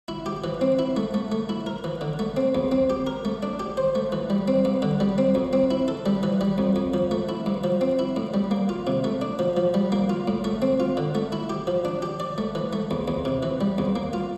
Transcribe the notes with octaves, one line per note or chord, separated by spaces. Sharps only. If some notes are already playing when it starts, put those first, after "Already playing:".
E4
G4
E3
C4
E4
A3
A3
A3
E4
A#4
E3
D3
A3
C4
E2
C4
G4
A#4
A3
D4
G4
C5
A3
E3
G3
C4
G2
D3
G3
C4
F2
C4
E4
A4
G3
E3
G3
F2
F2
F3
A3
E4
G2
F3
C4
E4
A2
G3
A#3
F4
C3
A3
D4
F3
F3
G3
A#3
F4
A2
A3
C4
F4
D3
A3
E4
G4
F3
D4
G4
D5
A3
E3
A3
E2
E2
C3
E3
G3
E2
A#3
F4